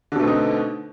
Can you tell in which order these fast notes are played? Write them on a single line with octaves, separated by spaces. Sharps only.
D3 B2 A3 C4 D#4